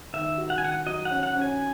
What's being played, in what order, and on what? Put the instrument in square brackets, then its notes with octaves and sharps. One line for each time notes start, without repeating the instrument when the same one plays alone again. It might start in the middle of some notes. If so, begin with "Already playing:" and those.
[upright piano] D#3 [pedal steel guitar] E5
[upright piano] F#4
[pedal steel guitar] F#5
G#5
[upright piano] D#3 [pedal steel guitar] F#5
[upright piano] F#3 [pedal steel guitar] D#5
[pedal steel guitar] F#5
[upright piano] C#4
[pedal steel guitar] F#5
[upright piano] C#4
[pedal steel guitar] G#5